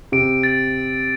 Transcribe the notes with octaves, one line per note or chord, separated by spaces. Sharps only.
C3 D7
A6